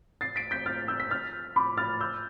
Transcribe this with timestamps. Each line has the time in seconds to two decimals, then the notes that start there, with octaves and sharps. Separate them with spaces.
0.21 A6 C7
0.36 B6 D7
0.51 G6 B6
0.66 F6 A6
0.88 E6 G6
1.00 B6
1.11 F6 A6
1.56 B5 D6
1.77 F6 A6
2.01 E6 G6